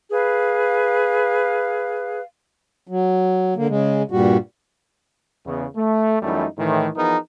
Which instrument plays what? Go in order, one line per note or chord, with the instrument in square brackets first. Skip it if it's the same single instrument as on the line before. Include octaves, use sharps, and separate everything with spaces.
[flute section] G#4 B4 F5
[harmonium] F#3
D3 A#3
C#3 G#3
G2 A#2 G3 F#4
[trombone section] E2 C#3 B3
A3
F#2 E3 G3 A3 D#4 E4
A2 D#3 E3
E3 F3 B3 D#4 G#4 A#4